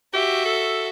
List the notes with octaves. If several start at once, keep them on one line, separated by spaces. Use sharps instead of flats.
F#4 G4 E5
A4